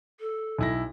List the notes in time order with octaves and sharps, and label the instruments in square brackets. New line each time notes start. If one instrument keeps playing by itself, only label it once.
[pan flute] A4
[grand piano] B1 E4 A#6